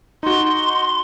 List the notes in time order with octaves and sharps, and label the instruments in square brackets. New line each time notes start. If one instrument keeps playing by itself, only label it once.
[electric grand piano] D#4 F#4 [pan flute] C6